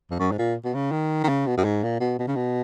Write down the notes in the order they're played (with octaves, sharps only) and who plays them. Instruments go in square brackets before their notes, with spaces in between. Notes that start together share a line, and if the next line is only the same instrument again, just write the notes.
[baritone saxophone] F2
F#2
G#2
A#2
B2
C#3
D#3
D#3
C#3
B2
F#2
G#2
A#2
B2
B2
C#3
B2